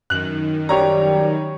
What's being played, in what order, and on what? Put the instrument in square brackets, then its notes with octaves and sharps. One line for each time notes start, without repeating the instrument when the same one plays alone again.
[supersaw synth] F#2 D#3 [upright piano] F#6 F#7
[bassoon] G3 [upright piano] G4 C#5 A#5